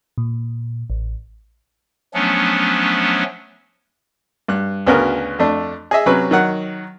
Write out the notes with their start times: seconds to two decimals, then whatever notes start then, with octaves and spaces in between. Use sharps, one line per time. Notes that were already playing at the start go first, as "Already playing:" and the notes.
0.18 A#2
0.90 A1
2.14 F3 F#3 A3 B3 C#4 D4
4.48 G2 F#6
4.86 D2 C#3 B3 C#4 F#4 A#4
5.39 F2 A3 D4
5.91 G#4 D#5 E5
6.06 C3 F#3 C#4 B4
6.31 D#3 F#3 F#5